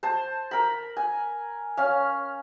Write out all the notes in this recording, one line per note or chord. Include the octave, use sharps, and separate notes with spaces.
C5 A5
A#4 B5
G#5
C#4 F5